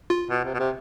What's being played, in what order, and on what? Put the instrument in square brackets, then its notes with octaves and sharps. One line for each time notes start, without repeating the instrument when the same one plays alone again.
[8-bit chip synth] F4
[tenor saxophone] B2
C3
B2
C3